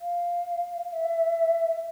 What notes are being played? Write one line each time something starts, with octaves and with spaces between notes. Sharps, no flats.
F5
E5